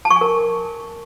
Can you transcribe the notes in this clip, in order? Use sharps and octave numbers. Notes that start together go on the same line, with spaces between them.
A5
C#6
G#5
A#4